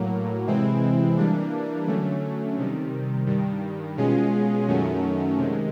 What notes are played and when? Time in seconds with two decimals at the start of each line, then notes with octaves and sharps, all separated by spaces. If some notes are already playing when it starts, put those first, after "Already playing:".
Already playing: A2 F#3 A#3
0.47 C3 E3 G#3 C4 E4
1.17 E3 G3 A#3 D4
1.87 D3 F#3 A3 C#4
2.57 C3 D#3 G3
3.27 G2 D#3 G3
3.97 B2 G#3 C#4 F4 G#4
4.68 F#2 D#3 F#3 A3 C#4
5.37 C3 D#3 G#3